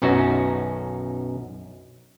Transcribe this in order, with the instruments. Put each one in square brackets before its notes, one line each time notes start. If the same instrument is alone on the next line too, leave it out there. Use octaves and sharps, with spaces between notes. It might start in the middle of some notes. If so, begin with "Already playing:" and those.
[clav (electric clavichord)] B1 F#2 C#4 D#4 F#4